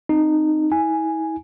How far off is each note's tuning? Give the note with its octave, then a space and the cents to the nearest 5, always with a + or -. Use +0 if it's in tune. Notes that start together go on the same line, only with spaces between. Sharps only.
C4 +0 D#4 -15
E4 -40 G#5 +0